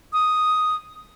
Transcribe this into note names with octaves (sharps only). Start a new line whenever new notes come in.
D#6